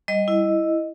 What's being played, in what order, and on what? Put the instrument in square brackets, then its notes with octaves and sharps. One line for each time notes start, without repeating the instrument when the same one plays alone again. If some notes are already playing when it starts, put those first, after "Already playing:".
[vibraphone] G3 D#5
E4